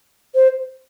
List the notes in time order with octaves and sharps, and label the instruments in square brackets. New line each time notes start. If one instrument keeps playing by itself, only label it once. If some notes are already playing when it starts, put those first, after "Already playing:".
[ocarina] C5